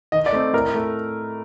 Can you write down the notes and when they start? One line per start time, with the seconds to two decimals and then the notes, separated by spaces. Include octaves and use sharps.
0.12 D#3 D#5
0.26 D5
0.32 A3 C4 D#4
0.53 A2 A#4
0.75 A3